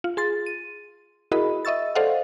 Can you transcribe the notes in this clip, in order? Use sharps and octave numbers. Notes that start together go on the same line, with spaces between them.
F4
G#4 C6 A6
D#7
E4 F#4 G#4 A#4 D#5 B5
D#5 E5 C#6 E6 A6
A4 C5 D5 D#5 F5 F#5